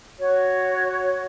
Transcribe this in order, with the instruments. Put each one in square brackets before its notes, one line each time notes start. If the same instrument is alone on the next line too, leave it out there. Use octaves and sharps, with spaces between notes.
[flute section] F#4 C#5